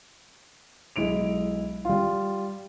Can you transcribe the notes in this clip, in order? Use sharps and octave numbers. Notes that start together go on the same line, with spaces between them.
B1 G#3 E4 D7 F7
G3 F4